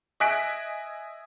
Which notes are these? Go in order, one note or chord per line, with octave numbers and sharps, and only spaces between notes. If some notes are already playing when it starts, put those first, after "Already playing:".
D#5 E5 G#5 F#6 B6 D7